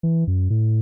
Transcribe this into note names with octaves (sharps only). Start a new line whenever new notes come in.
E3
F#2
A2